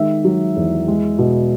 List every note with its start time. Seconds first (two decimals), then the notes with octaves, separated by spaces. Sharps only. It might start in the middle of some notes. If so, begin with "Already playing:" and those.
Already playing: D#3 G#3 E5
0.24 F#3
0.56 E2
0.88 G#3
1.18 B2